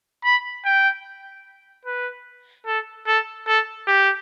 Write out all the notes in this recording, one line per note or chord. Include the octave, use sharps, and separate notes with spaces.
B5
G5
B4
A4
A4
A4
G4